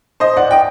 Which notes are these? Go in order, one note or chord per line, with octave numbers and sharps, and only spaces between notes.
C5 D#5
D5 F#5
D#5 G5